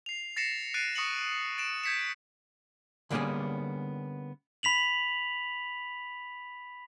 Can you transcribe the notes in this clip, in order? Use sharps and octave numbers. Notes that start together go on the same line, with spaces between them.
C7 F7
A6 A#6 C7 C#7 E7
F#6 A6 C7 D7 D#7
C#6 D#6 A#6 C#7 E7 F#7
A6 D7 E7
G6 G#6 B6 C#7 E7
D3 G3 A#3 B3 C#4 G#4
B5 B6 F7 F#7